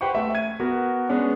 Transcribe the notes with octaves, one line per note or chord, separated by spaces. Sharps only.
G4 B4 C5 F#5 G5 C#6
A3 E5
G#6 D#7
B3 F#4 A#4
G#3 B3 C#4 D4